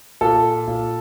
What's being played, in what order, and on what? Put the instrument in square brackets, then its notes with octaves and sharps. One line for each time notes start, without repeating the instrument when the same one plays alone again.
[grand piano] A#2 A4
A#2